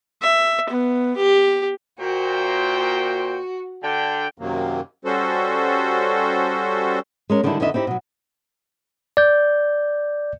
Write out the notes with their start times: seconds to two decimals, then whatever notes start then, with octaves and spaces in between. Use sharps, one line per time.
0.22 E5
0.70 B3
1.16 G4
2.00 A#2 F#4 C5 G5
3.83 D3 G5
4.38 F#2 C3 D#3 F#3 A#3
5.05 G3 C#4 F#4 A4 C5
7.30 G#3 C#4 A#4
7.43 D3 D#3 G3 G#3 D4 E4
7.60 F2 D3 D#3 B3 D#5 E5
7.74 C4 D#4 E4 G4
7.87 B2 F#3
9.17 D5 G6